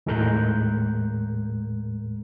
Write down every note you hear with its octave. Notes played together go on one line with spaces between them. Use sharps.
D#2 A2 G#3 A#4 F#6 G6